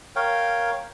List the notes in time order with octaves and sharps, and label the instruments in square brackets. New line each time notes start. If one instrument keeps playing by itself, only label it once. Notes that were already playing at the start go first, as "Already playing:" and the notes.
[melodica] A#4 C#5 F5 G5